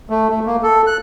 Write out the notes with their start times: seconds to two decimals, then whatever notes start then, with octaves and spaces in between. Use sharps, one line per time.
0.10 A3
0.29 A3
0.46 A#3
0.63 A4
0.87 F#6